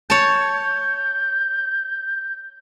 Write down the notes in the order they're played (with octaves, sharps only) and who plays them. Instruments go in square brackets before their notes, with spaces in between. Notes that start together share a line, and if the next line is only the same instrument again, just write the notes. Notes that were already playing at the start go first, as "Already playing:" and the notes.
[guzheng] C#5 A5 [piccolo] G6